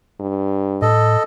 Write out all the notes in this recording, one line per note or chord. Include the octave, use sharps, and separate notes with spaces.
G2
A2 A4 D#5